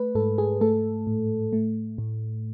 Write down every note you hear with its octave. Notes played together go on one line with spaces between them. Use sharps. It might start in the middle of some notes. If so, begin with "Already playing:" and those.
Already playing: A3 B4
G#2 A4
G#4
A3 A4
A2
A3
A2